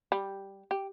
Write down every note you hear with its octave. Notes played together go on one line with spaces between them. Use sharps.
G3
G4